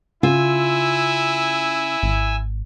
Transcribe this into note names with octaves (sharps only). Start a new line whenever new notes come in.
C#3 E4 F4 G#5 E6
G#1